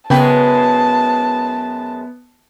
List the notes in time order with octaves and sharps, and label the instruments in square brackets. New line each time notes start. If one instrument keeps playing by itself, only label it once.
[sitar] F#2 G#3 B4 [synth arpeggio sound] C#3 G5 [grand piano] B3 [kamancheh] A5